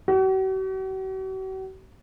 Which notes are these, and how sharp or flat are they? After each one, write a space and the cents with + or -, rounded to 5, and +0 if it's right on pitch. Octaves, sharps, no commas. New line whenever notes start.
F#4 +45